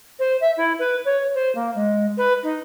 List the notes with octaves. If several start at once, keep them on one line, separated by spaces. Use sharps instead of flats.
C5
E5
E4
B4
C#5
C5
A#3
G#3
B4
D#4